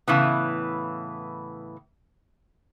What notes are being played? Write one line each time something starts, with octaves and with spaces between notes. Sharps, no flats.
A2 C#3 E3 B3